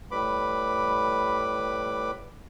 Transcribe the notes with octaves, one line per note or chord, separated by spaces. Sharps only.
A2 G3 B4 B5 D6